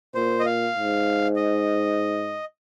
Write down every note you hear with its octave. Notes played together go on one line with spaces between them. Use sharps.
A#2 C5
D#5
F5
G#2
D#5